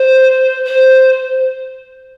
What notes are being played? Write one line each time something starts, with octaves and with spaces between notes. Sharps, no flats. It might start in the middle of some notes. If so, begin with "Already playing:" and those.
Already playing: C5
C5